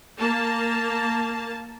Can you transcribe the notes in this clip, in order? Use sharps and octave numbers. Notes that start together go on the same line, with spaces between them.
A#3 A5